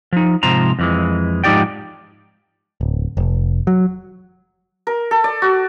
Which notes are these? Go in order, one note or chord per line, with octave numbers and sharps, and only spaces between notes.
F3 D#4
G#2 C3 F3 C5 A#5
F2 E3 G#3
G#2 F3 D#4 G4 D5 G5
D1
F1
F#3
A#4
A4
D5
F#4